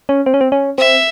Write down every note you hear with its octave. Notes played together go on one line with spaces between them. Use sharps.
C#4
C4
C#4
C4
C#4
C4 E5